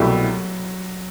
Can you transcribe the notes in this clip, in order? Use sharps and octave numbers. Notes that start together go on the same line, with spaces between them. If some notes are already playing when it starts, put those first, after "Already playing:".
Already playing: C2 B2 F#3 A3 E4 G4